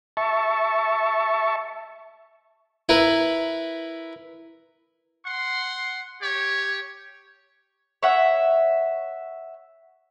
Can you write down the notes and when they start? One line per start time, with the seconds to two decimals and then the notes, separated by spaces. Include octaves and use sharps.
0.17 E5 A5 C#6
2.89 E4 A#4 B4
5.26 F#5 C6
6.22 G4 C#5
8.03 C#5 E5 F#5